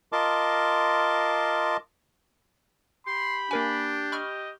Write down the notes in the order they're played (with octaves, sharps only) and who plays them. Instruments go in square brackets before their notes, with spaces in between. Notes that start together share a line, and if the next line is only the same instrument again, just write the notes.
[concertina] F4 A#4 D#5 A5 C6 D6
[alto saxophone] G4 [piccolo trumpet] B5 [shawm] C6
[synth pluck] A#3 A#4 G#5 [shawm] D4 [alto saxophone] G4
[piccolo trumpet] D#5 [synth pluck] B5 C#6 F6